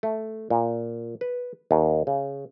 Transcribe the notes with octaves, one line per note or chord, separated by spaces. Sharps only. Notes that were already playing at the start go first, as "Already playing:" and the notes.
A3
A#2
B4
D#2
C#3